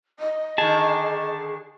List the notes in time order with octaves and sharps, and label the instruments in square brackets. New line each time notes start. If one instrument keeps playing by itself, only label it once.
[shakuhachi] D#5
[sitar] D3 D#3 [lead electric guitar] G#4 [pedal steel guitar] A5